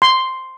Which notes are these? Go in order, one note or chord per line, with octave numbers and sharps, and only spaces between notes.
C6